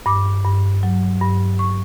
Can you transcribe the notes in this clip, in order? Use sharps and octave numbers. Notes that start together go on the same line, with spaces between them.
G2 D6
G2
F#3
G2
C#6